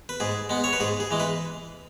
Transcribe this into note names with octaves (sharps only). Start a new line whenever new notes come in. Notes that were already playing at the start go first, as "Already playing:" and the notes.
B4
G#2 G#4
G#3 B3
C#5
B4
G#2 G#4
G#4
E3 G#3
B4